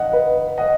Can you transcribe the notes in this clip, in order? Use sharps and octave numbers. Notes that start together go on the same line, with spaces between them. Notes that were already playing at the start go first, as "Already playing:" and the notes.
Already playing: D#5 F#5
B4 D#5
D#5 F#5